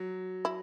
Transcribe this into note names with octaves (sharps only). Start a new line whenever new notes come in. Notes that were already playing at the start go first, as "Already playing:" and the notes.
Already playing: F#3
E4